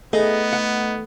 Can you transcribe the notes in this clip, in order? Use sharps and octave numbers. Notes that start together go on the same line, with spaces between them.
A3 B3 D#4 G#4
F#5